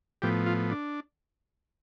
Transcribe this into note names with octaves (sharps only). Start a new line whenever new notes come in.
A2 F3 B3 G4
F4
D4